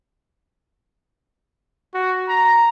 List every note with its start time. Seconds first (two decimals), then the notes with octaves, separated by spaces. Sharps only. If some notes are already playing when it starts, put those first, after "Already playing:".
1.94 F#4
2.28 A#5